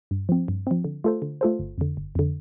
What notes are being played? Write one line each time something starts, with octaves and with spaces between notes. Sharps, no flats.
G2
F3 C4
G2
F3 C4
D3
A3 F4 A4 C5
D3
A3 F4 A4 C5
G1
F2 D3
G1
F2 D3